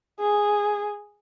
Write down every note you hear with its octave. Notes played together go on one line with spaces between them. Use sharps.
G#4